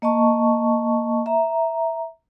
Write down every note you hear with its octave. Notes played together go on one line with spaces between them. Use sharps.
A#3 D#5 A5 C#6
E5 A#5